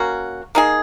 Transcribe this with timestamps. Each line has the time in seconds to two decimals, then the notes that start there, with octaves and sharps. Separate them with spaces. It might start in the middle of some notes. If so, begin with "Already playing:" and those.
Already playing: A#3 C#4 F#4
0.55 A#3 D#4 G#4